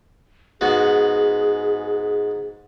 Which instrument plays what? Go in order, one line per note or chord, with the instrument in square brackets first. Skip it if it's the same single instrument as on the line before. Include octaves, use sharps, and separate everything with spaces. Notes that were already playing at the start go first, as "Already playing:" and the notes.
[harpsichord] G#2 B3 F#4 [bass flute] G#4